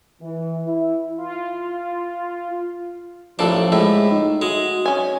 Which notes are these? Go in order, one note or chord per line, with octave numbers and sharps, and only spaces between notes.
E3
E4
F4
A1 F3 A#3 D4 A4
A2 G#3 E5
D#4
G#3 F#4
C#4 G#5